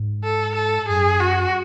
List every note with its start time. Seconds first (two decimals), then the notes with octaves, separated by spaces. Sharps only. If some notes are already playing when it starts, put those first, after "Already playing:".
Already playing: G#2
0.24 A4
0.55 A4
0.88 F#2 G#4
1.20 F#4